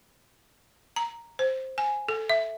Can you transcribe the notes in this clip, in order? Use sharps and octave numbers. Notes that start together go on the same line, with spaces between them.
A#5
C5
G#5
A4
E5